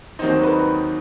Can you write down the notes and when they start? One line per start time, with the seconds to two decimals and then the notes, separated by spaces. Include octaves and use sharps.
0.19 D#2 D#3 F#3 C4 D#4 C5
0.43 B4